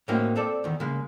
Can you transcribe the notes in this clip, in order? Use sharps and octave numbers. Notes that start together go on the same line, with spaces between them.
A2 F#3 A#3 C4 C#4 D#4
C4 A4 D5
E2 D#3
C#3 G#3 A#3